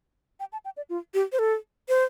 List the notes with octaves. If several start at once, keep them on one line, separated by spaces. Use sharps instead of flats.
G5
A5
G5
D5
F4
G4
C5
A4
C5